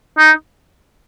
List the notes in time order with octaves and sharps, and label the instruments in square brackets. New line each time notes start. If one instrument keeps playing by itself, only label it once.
[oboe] D#4